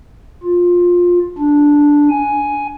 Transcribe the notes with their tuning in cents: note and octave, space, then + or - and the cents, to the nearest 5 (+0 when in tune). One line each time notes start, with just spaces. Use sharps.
F4 +15
D4 -5
G#5 +5